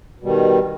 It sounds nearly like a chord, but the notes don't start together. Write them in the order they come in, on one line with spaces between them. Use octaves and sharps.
B2 G3 D#3